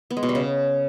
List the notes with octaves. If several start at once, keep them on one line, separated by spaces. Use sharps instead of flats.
B3
G#3
B2
G3
C#3